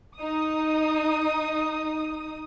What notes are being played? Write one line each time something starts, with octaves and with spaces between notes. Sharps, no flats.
D#4 D#6